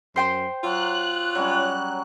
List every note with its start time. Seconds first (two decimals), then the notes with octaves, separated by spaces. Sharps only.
0.16 F#2 C5 G5 C6
0.64 F#3 F4 F#6
1.35 F#3 G3 C#4 C#5